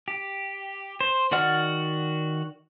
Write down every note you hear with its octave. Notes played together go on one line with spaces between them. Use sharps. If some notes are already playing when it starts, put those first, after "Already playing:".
G4
C5
D#3 F#4 D5 F#5 F6